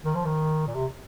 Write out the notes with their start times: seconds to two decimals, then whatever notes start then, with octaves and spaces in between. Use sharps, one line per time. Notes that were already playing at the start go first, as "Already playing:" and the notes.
0.05 D#3
0.15 F3
0.25 D#3
0.67 A#2
0.75 C3